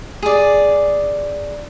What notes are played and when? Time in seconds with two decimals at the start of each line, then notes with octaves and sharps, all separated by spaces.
0.22 G#4 D5